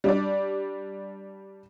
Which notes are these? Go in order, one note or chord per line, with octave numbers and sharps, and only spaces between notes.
G3 D4 D5